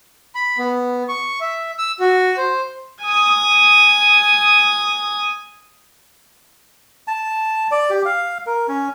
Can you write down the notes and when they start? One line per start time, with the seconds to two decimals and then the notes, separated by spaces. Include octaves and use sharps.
0.35 B5
0.58 B3
1.08 C#6
1.41 E5
1.78 E6
2.00 F#4
2.37 C5
3.02 G#5 D#6
7.08 A5
7.71 D5
7.90 G4
8.05 F5
8.46 A#4
8.68 C#4